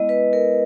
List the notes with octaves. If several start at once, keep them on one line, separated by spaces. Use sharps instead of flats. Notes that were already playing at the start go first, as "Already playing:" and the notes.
Already playing: G#3 B3 E4 D#5
B4
A#4